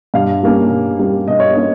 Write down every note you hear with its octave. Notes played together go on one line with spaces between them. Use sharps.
G2 F5
G3 A#3 C#4
G2
G3 A#3 C#4
G2 D#5
C#5
G3 A#3 C#4 D#5